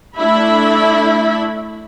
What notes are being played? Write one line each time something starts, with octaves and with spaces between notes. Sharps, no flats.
A3 D4 E4 E5 B5